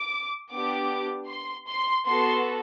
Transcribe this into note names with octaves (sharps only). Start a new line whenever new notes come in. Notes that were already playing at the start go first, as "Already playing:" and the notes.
Already playing: D6
B3 D4 G4 D6
C6
C6
B3 F#4 A4 C6